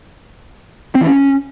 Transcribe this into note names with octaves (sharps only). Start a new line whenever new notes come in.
C4
E3
C#4